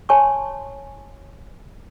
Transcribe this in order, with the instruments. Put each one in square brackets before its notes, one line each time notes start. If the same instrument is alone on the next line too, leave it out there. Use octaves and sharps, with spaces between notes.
[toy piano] C#5 G#5 A5 C6 C#6